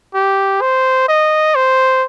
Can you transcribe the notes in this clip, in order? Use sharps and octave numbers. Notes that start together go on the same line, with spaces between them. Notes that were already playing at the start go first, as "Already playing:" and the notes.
G4
C5
D#5
C5